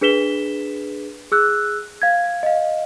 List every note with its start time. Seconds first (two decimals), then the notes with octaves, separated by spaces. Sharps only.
0.01 D4 G#4 B4 B6 E7 G7
1.32 G#4 E6 F#6
2.02 F5 G#6
2.43 D#5 F5